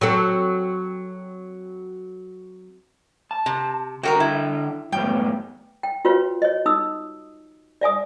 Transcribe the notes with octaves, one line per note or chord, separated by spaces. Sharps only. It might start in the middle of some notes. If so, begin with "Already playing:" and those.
F#3 C4 A4
A5
C3
D3 F#4 A4 A#4 G5
E4
F#2 A2 B3 G5
G5
F4 F#4 B4 C#5 F5
C#5 D#5
D#4 D#6 E6
D5 E5 G#5 D#6